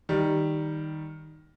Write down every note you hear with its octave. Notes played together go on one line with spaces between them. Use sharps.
D#3 G3